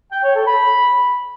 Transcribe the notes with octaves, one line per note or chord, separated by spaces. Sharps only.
G5
C#5
A4
B5